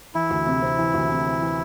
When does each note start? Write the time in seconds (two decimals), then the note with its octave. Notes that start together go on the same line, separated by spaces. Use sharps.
0.15 E3 E4
0.30 D2
0.46 C3
0.62 C4
0.78 E3
0.94 D2
1.09 C3
1.26 C4
1.41 E3